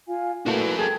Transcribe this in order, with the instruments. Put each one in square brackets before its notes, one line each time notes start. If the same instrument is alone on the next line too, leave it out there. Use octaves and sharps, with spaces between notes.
[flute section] F4 F5 G#5
[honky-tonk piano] A#2 A3 [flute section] E4 B4 [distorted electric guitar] F#4 A#4
[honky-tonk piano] G#4 A4 [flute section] G5 G#6